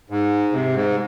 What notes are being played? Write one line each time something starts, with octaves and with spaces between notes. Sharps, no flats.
G#2
C3
G#2